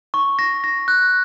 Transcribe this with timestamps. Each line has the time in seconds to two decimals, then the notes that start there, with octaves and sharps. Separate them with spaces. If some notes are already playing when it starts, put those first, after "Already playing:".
0.14 C#6
0.39 A#6
0.64 A#6
0.88 F#6